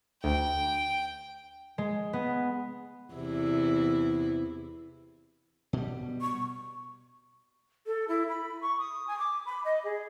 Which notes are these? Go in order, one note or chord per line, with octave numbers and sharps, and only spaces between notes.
D2 G5
G#3
B3
E2 C3 E4
B2 G3
C#6
A4
E4
B5
C#6
D#6
G#5
D6
B5
D#5
G#4